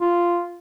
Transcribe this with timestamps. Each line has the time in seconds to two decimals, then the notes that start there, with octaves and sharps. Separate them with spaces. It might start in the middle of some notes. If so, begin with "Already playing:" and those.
0.01 F4